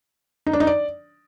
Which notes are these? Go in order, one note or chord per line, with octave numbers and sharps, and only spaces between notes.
D#4
D4
D#4
D5